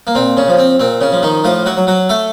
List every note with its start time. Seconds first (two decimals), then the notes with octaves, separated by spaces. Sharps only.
0.07 A#3
0.15 A#2 C4
0.37 C#3 C#4
0.48 F3
0.59 C4
0.79 A#2 C4
1.01 C#3 C#4
1.12 F3
1.23 D#3 D#4
1.44 A2 F3 F4
1.66 F#3 F#4
1.77 F#3
1.87 F#3 F#4
2.09 A3 A4